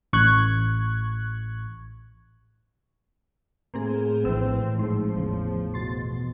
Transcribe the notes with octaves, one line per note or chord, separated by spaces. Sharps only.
A1 C#6 F#6 G#6
A2 A#3 C4 G#4
A#1 E3 C4 E6
G#2 F3 C6
A1 E2 C#3
B2 C6 A6